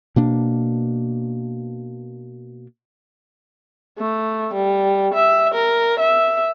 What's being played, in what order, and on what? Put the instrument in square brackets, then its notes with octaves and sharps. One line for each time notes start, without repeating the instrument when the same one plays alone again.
[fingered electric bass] B2 A#3 D4
[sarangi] A3
G3
E5
A#4
E5